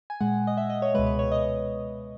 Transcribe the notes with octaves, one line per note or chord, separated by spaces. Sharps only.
G#5
A#2 G#3 F#5
D#5
E5
D#5
C#5
C#2 B2 G#3 B4
B4
C#5
D#5